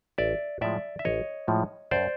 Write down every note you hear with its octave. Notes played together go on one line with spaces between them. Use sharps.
A1 D5 E5
A2 F3 G#3 D5 E5
E5
A1 C#5 D#5
A2 F3 G#3
F#2 C5 D5